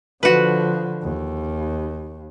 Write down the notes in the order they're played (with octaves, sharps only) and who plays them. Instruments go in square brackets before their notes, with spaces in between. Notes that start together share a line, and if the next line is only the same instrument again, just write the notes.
[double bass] D3 F3 [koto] F#4 B4
[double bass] D#2